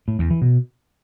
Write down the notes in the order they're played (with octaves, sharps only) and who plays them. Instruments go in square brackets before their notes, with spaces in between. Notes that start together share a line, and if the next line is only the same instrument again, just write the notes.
[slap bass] A2
E2
E3
B2